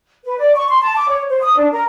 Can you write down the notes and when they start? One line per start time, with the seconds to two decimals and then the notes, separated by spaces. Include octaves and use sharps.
0.24 B4
0.37 D5
0.55 C#6
0.68 C6
0.82 A5
0.95 D6
1.09 C#5
1.29 C5
1.42 D#6
1.57 D4
1.72 A#4